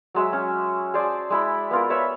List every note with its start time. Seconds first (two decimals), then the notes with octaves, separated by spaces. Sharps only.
0.14 F#3 G#3 E5
0.33 C#4
0.94 G#4 C5 D5 A5
1.30 G#3 E4 B5
1.71 B3 F4 A#4
1.90 B4 C#5 E5 B5